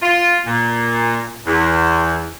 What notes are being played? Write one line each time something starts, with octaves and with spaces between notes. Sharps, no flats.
F4
A#2
E2